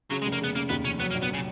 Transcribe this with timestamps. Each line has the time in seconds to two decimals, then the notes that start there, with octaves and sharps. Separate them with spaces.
0.10 C#3 F#3
0.22 G#3
0.26 F1
0.32 A#3
0.41 C#3 B3
0.55 C#3 A#3
0.70 D#2 B3
0.84 F1 C#4
1.00 F#3 B3
1.11 A#3
1.14 A#1
1.22 B3
1.29 C#3 F#3